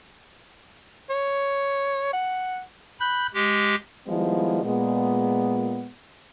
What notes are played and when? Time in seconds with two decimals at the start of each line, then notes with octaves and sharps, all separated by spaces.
1.09 C#5
2.13 F#5
3.00 B5 F#6 G6
3.34 G#3 G4
4.07 D#3 F3 G3 G#3 B3 E4
4.64 A#2 G#3 B3